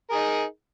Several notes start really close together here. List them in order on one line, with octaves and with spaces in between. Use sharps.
A#4 G#4 D#4